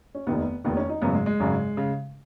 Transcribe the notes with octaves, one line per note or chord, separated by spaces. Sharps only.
C#4
F1 D#2 D#3 B3
F1 D#2 D#3 B3
C#4
D#4
G#1 F#2 C#3 B3
G#3
G#3
G#1 F#2 C#3
C#3